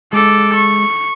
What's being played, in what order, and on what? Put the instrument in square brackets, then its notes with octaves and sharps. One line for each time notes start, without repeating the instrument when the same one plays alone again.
[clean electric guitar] G#3 [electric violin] A4 D6
[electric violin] C#6